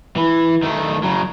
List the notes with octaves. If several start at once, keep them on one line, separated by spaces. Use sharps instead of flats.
E3
D#3 A3
C#3 F#3